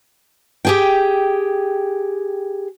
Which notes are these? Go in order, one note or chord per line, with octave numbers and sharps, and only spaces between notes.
G4 G#4 G5